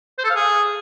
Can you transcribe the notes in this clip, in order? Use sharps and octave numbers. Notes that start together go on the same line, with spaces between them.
C5
A4
F5
G#4